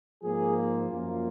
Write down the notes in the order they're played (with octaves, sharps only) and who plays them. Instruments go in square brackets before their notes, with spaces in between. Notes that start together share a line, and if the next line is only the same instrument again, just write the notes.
[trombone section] G#2 F3 A#3 G#4
F4
F#2 F3 A#3